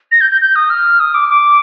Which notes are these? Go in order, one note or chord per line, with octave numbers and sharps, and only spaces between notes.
A#6
G6
G6
G6
D#6
F6
D#6
D6
D6